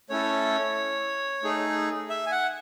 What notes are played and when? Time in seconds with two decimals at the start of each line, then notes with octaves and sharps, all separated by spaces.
0.10 A3 C#4 E4 A4 C#5
1.43 A3 D#4 G#4
2.09 E5
2.26 G#5
2.31 F#5